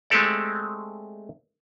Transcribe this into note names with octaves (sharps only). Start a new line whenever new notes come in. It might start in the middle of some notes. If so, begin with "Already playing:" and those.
G#3 A3 C4 G4 A4 D5